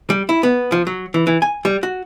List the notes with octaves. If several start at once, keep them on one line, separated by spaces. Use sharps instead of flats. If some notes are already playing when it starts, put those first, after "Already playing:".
G3
E4
B3
F3
F#3
E3
E3
G#5
G3
F#4